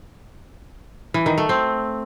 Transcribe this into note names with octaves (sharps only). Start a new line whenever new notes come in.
E3
D#3
A3
C4